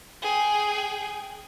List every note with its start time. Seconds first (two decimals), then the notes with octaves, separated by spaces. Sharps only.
0.22 G#4 G5